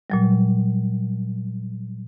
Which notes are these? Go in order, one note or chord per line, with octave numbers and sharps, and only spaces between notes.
A#2 F#3 G3